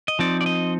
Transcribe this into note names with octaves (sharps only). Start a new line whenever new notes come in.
D#5
F3 C4 D#4 D5
D5
D#5